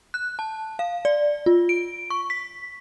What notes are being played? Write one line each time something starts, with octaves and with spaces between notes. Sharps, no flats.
F#6
A5
F5
D5
F4
D7
C#6
B6